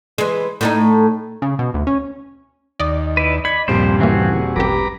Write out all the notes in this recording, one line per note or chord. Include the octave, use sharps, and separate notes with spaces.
E3 G#3
A2 A3 D#4
C#3
B2
D2
C#4
D#2 D5 D#5
E4 B4
B5 G#6 C#7
D#1 G2 A#2 F3 G3 C4 C5
C#3 E3 A#3 C4 F#4 G#4
G#1 F#2 G4 B4 A#5 D6